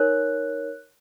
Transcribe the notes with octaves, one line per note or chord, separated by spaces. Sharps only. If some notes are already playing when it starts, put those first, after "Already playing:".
Already playing: D#4 A#4 C#5 F#6